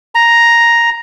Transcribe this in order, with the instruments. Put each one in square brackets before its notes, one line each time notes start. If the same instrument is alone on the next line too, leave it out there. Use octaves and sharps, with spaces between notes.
[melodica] A#5